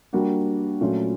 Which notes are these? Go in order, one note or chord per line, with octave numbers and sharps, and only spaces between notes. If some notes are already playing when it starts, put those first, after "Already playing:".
G3 A#3 D4 F#4
A#2 F#3 A3 C#4 F4